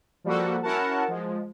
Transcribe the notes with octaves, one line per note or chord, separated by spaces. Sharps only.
F3 G3 A#3 F#4 A4
C#4 E4 F#4 A#4 F#5 A5
F3 G#3